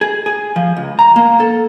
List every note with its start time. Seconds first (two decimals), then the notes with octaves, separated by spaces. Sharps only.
0.01 G#4
0.26 G#4
0.56 F3
0.77 C#2
0.99 A#5
1.16 A#3
1.40 A4